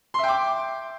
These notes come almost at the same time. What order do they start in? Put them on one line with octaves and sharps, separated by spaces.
C6 E5 G5 D6